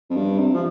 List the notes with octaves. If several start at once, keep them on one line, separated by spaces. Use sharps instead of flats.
F2
G2
C3
F3